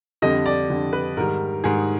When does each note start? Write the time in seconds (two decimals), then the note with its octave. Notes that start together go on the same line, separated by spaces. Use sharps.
0.22 F2 D3 G3 D#5
0.46 D5
0.69 F2 D3 G3
0.93 B4
1.17 G#2 D#3 G3 A#4
1.64 G#2 D#3 G3 G#4